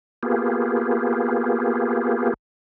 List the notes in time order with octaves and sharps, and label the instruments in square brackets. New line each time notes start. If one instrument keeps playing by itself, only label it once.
[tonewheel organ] A#3 B3 F4 G4 G#4